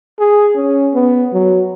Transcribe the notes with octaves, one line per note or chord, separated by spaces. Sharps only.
G#4
C#4
B3
F#3